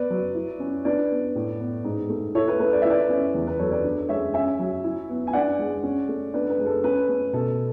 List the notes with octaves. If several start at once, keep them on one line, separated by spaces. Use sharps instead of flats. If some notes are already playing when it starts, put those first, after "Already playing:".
Already playing: B3 B4 D5
F#3
E4
C#4
D4 B4 D5
B3
A2
B3
G#2
A3
E4 A4 C#5
B4
A3 B4
D5
E4 E5
B4 D5
C#4
E2
B4
F#3 A4 C#5
B4 D5
D4
G#3 C#5 E5
C#4 E5 G#5
F#3
E4
B3
G#5
D4 D5 F#5
G#3
C#4
A3
D4 B4 D5
B4
G#3
A4
C#4 B4
A3
B2 A4